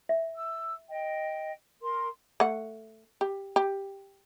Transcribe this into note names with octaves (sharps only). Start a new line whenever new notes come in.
E5
E6
D#5 G5
A#4 C6
A3 F#5
G4
G4